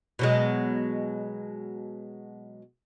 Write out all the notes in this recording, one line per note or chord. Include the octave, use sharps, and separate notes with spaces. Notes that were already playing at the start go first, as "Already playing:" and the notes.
B2 F#3 G#3